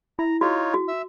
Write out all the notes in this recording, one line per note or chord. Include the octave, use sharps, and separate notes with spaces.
E4 A#5
D#4 F4 F#4 C#5
F#4
E5 E6